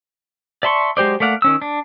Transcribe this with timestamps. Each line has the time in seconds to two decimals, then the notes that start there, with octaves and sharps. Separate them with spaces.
0.63 D5 E5 A5 C6 C#6
0.97 F#3 G#3 G4 C5 D5
1.20 A3 A#3 D5 F5 F#5
1.42 D#3 C#4 E6
1.62 D4